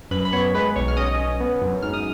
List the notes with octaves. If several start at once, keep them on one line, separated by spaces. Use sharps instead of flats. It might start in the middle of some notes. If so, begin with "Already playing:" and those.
F#2 B4 B5
B5
B3 C#5 C#6
G#3 B4 B5
B1 C#5 C#6
F6
C#4 D#5 D#6
C#4
B3
F#2
G#2 F6
D#6